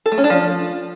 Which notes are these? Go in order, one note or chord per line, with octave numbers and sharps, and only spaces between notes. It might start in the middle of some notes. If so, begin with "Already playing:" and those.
A4
A3
C#4
D4
F3